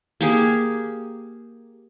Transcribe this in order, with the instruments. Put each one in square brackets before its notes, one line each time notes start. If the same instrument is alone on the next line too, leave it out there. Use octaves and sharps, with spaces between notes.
[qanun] A#3 G4 G#4